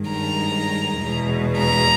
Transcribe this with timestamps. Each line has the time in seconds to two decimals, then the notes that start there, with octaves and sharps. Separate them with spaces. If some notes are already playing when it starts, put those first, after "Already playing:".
Already playing: G2 D#3 G#3
0.10 A#5
0.99 E2 B2 G#3
1.58 A#5